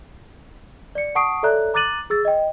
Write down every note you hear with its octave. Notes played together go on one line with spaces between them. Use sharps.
D5 C#7
F#5 A5 C#6 D#6 C7 D7
A4 C#5 D5 E5 A#5 F#6
A#5 D6 F#6 A6 D#7 F#7
G#4 E6 A6
D#5 G5